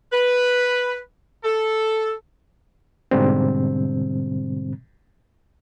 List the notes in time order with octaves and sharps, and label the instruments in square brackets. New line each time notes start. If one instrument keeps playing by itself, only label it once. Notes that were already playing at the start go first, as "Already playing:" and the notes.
[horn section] B4
A4
[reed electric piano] G#2 B2 D3 G3 C4